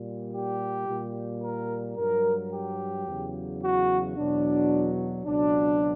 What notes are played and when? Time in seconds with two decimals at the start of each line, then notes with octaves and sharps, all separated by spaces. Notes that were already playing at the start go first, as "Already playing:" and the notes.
Already playing: A#2 G3
0.34 G4
0.89 A#2 G3
1.43 A#4
1.97 G2 F#3 A#4
2.52 G4
3.07 E2 C#3 F#3
3.62 F#4
4.17 E2 B2 F#3 D4
5.25 C#2 B2 F#3 D4